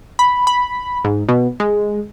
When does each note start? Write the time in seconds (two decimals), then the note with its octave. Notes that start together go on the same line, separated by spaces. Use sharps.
0.19 B5
0.47 B5
1.05 G#2
1.29 B2
1.60 G#3